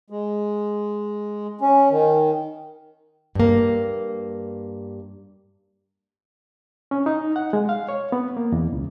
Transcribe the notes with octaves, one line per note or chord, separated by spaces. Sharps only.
G#3
C#4
D#3
G2 A#3
C#4
D#4
F#5
G#3
F5
C#5
B3
A#3
E2
C#2